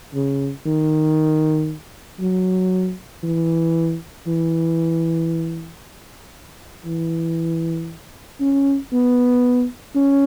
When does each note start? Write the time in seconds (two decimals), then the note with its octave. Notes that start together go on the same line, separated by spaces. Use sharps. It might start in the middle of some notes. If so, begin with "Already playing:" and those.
0.14 C#3
0.66 D#3
2.20 F#3
3.23 E3
4.27 E3
6.86 E3
8.40 C#4
8.92 B3
9.95 C#4